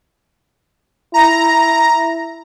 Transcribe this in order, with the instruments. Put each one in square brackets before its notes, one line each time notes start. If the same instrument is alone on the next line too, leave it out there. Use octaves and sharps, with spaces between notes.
[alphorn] E4 [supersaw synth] A#5